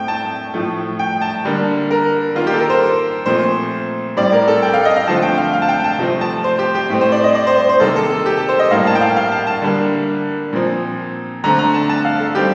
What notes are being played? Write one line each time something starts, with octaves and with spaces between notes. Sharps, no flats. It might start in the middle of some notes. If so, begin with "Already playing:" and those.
Already playing: A2 A3 C4 G5
A5
A2 F3 A3
G5
A5
D3 G3 A#3
A#4
D#3 A#3 F4
G4
A4
A#4
C5
A#2 F3 A3 C4 C5
A2 G3 C4 D5
A#4
A4
G5
F5
D#5
F5
D3 F3 A3 C4 A5
G5
F5
F5
A5
G5
A5
C3 F3 A3 C4
A5
C5
G4
G4
A2 A3 C4
C5
D5
D#5
D5
C5
C5
C5
C3 D#3 A#3 A4
A4
A4
G4
A4
C5
D#5
A2 G3 A#3 F5
A5
G5
F5
F5
A5
A5
D3 G3 A#3
A#2 F3 C4
D3 A3 C4 A#5
A#5
A5
A5
F5
A4
D#3 G3 C4 G4